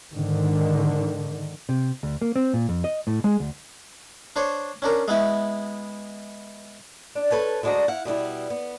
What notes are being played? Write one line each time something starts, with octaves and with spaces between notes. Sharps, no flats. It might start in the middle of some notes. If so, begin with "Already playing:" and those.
G#2 D3 D#3
C3
D2
A#3
C4
A#2
F2
D#5
A2
G#3
D2
D4 C5 C#5
C#4 D4 A#4
G#3 B3 E4
D4
A4 B4 C#5 A5
D2 G#3 D4 F#4 D#5 A#5
E4 F5 F#5
B2 G3 B3 E4
B3